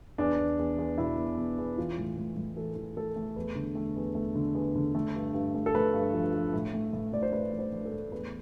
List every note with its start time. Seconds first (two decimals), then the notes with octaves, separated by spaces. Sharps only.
0.18 E2 D4
0.38 E2
0.59 E2
0.78 E2
0.98 B2 E4
1.18 B2
1.38 E2
1.58 E2
1.77 E3 F4
1.98 A2
2.18 A2
2.37 A2
2.56 E3 A4
2.76 E3
2.97 A3 A4
3.16 A3
3.36 E2 B4
3.55 D3
3.75 A3
3.96 E2
4.15 A3
4.35 D3
4.55 E2
4.76 D3
4.95 A3
5.15 G2
5.34 G2
5.55 A3
5.66 A4
5.75 A3 B4
5.94 G2
6.13 F3
6.34 F3
6.54 A2
6.74 A3
6.93 A2
7.13 A2 D5
7.23 C5
7.33 A3 B4
7.53 A3
7.59 C5
7.72 A3
7.86 A4
7.92 A2
8.12 E2 B4